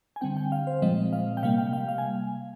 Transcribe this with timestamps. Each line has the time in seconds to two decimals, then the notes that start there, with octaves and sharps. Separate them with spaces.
0.16 G#5
0.21 D3 G3 C4 G5
0.37 G5
0.52 F5
0.67 C5
0.82 A#2 F3 G#3 C4 D#5
1.13 F5
1.37 G5
1.43 C3 G3 A#3 F5
1.58 G5
1.73 F5
1.88 F5
1.98 G#5